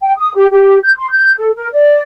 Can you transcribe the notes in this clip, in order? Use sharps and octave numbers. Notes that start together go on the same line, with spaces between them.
G5
D#6
G4
G4
G6
C6
G6
A4
A#4
D5